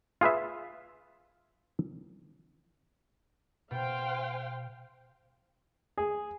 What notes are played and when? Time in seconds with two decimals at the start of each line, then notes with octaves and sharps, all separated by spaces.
0.21 F4 G#4 B4 E5
3.71 B2 C5 F5 G5
5.98 G#4